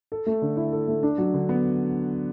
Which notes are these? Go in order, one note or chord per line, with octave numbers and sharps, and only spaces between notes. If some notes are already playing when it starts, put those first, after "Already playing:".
A4
A3
D3
E4
A4
A3
D4
F#3
D3
B3